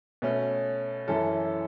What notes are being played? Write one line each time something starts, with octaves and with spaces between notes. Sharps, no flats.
B2 A3 C#4
F#2 E3 C#4 E4 A4